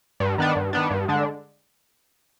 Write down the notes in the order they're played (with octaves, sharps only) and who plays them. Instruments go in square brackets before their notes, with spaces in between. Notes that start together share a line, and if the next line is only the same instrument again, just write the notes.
[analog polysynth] G2
D#3 B3 D4
G2
D#3 B3 D4
G2
D3 G#3 D4